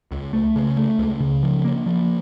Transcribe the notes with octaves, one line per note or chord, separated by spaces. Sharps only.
C#2
A3
C#3
A3
C#2
C#3
F3
A#3
F3